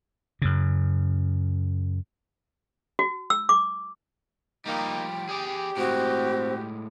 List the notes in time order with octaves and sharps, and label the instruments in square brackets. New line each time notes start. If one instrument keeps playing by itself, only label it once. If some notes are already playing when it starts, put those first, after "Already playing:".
[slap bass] F#2 C#3
[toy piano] F#4
E6
D6
[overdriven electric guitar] F3 G3 [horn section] A#3 D#4 [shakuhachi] G5
[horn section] G4 [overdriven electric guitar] G#4 D5
[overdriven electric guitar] A2 G#3 [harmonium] C4 [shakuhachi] F#4